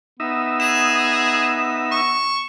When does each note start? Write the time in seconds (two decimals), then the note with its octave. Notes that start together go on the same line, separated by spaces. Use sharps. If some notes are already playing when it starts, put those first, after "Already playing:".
0.20 B3 D#4 E5
0.60 G#4 E7
1.91 C#6